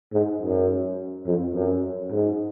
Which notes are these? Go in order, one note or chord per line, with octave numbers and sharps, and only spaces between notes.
G#2
F#2
F2
F#2
G#2